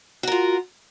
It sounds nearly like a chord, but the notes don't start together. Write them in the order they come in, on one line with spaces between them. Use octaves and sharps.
F#4 A#4 F4